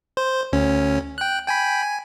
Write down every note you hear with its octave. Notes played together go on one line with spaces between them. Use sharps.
C5
D2 C#4
G5 F#6
G5 G#5 B5
G#5